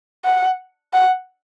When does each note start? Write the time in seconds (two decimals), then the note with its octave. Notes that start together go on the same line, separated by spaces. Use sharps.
0.25 F#5
0.93 F#5